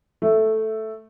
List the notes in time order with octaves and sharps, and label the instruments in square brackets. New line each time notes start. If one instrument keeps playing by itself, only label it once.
[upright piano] A3